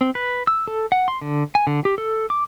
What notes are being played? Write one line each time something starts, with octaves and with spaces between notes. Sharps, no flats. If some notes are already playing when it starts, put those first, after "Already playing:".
C4
B4
E6
A4
F#5
C6
D3
G#5
D3
G4
A4
D6